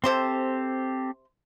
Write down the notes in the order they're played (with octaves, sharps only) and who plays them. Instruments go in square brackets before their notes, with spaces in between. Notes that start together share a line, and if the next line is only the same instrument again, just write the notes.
[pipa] C3 C5 C6 [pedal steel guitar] C4 G4 A4